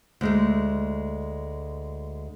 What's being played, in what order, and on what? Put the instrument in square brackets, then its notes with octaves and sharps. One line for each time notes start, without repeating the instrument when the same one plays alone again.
[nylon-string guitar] D2 G#3 A3